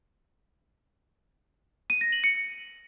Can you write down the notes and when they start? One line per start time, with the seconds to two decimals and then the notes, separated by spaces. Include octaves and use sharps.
1.90 D#7
2.01 A#6
2.12 F#7
2.24 C#7